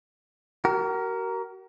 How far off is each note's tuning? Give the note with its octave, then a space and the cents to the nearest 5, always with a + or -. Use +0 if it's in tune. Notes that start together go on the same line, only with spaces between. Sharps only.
F#4 +45 A#4 +0